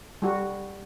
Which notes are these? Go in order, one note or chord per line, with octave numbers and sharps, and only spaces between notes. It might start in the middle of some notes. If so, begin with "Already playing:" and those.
G3 F#4